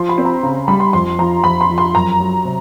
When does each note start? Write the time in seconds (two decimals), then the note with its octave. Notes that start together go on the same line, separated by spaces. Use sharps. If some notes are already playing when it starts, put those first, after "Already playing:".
Already playing: F3 C6
0.09 B5
0.18 C4
0.25 A#5
0.43 C#3
0.68 G3 B5
0.80 C6
0.93 F2 C6
1.19 F3 A#5
1.44 F2 B5
1.61 C6
1.70 F3
1.78 C6
1.94 F#2 A#5
2.20 F#3
2.45 C3